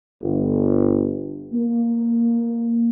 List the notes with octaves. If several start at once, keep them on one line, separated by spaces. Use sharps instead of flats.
G1
A#3